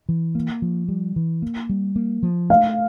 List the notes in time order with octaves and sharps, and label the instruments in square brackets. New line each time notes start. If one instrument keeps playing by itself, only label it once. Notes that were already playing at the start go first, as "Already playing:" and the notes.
[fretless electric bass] E3
A#3
F3
G3
E3
A#3
G3
A#3
F3
[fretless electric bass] A3 [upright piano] F5